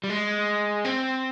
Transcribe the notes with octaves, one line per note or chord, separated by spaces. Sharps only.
G3
G#3
C4